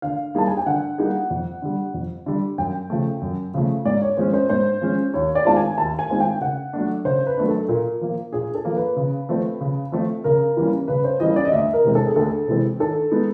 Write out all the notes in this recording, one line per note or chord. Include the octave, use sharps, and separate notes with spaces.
D3 F5
G3 A#3 D#4 G#4 A5
G#5
G5
D3 F#5
G3 A#3 D#4 G#4
F2
D3 G3
F2
D3 G3
F#2 G5
C#3 F3 A3
F#2
C#3 F3 A3
G#2 D5
C#5
F3 G#3 C#4 C5
C5
G#2 C5
F3 G#3 C#4
D#2 C#5
D5
D#3 G#3 C4 F4 A5
G#5
D#2 A5
G#5
D#3 G#3 C4 F4
G5
C#3 F#5
F#3 A3 D4
C#3 C5
B4
F#3 A3 D4
A4
A#2 A#4
F3 A#3
A#2 G#4
A4
F3 A#3
B4
C#3
F3 A3 C4
C#3
F3 A3 C4
C#3 A#4
E3 G3 A#3 C#4
C#3 B4
C5
E3 G3 A#3 C#4 D#5
D5
D#5
D2 E5
A#4
C3 E3 G#3 C4
A4
G#4
D2 A4
C3 E3 G#3 C4
D#3 A4
G#3 B3 D#4